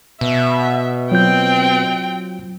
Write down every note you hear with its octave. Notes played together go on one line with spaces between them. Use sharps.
B2 E5
F#3 C4 F4 G5 G6